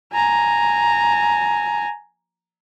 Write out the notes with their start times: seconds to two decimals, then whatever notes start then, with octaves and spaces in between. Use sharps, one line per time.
0.12 G#5 A#5